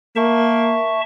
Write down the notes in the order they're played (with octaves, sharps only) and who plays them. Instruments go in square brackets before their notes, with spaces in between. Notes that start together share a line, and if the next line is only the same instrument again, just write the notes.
[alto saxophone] A#3 [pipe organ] E5 A5 C#6